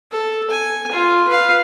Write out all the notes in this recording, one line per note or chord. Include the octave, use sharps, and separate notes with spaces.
A4
G#5
F4
B4 F5